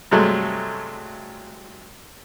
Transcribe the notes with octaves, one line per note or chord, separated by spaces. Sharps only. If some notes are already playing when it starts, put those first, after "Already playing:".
G2 C3 F#3 G#3 A3